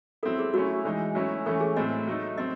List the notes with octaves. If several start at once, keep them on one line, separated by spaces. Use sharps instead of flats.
F#3 C4 E4 A4
G#4
F#3 A3 C#4 E4 F#4
E3 G#3 D#4
F#3 A3 C#4 E4
E3 A3 C#4 A4
G#4
A2 F#3 C4 E4 D#5
F#3 A3 D#4
F#3 C4 D#5